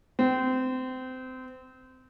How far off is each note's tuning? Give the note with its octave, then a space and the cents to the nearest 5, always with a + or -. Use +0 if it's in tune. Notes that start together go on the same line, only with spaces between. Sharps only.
C4 -25